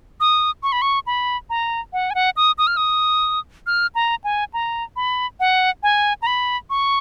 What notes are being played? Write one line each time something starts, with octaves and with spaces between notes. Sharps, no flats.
D#6
C#6
B5
C#6
B5
A#5
F#5
G#5
F#5
D#6
D#6
F6
D#6
F6
A#5
G#5
A#5
B5
F#5
G#5
A#5
B5
C#6